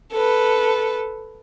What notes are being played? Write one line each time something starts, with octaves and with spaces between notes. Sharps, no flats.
A4 B4